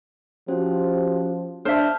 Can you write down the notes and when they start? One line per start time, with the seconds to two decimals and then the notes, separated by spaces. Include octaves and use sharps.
0.48 F3 C#4 F#4 G4 C5
1.65 D4 C5 E5 A5 F6 G6